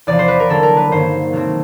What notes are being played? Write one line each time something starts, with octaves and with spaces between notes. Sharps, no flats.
E2 C3 F3 D5
C5
B4
A#4
D3 F#3 A#3 A4
A#4
B4
G2 D#3 F#3 A#3 C5
B2 F#3 A3 C4